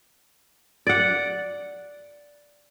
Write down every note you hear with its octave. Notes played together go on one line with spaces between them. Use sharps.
D5 F#5